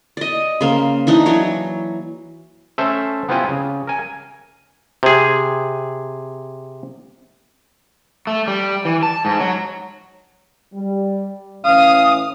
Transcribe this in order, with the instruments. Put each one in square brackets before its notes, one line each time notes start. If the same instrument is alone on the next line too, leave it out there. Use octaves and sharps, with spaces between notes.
[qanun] D5 D#5
C#3 A#3 C5
E3 D4 D#4
E3 F#3 C#5
[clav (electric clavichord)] A3 C#4 A4 C5 E5
B3 C4 E4 F4 G4 G#5
C#3
A#4 G#5
C3 G#4
[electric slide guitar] A3
G3
E3
A5
G#2
F#3
[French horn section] G3
[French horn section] A2 E3 C#4 [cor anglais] F5 [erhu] D#6